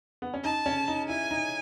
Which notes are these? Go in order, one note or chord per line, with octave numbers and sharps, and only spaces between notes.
B3
C#4
D#4 A5
C#4
D#4
E4 G#5
D#4